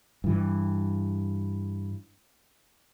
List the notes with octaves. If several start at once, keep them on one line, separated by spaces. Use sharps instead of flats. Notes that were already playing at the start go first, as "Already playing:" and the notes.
G2 E3